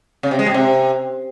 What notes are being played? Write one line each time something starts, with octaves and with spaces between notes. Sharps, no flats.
C#3
C3
G#3
G#2
C3